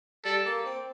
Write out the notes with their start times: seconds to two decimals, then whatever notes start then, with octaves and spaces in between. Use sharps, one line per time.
0.25 G3 A4
0.46 A#3
0.65 C4